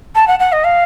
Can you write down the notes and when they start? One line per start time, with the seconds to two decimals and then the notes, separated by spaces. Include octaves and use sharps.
0.15 A5
0.28 F#5
0.39 F#5
0.52 D#5
0.64 F5